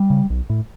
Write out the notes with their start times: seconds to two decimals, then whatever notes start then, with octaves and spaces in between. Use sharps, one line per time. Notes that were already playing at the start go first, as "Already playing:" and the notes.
Already playing: G3
0.10 C#3
0.30 B1
0.50 A2